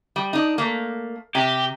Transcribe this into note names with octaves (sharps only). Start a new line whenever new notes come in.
G3
D4 D#4
A3 A#3
C3 G4